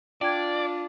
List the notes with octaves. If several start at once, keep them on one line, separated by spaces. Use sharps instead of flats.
D4 F4 D5 G5 G#6